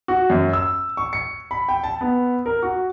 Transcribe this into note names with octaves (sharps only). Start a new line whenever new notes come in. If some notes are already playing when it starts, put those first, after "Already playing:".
F#4
F#2
E6
C#6
C#7
B5
G5
A5
B3
A#4
F#4